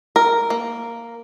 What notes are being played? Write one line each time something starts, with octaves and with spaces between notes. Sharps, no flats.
A#4
A#3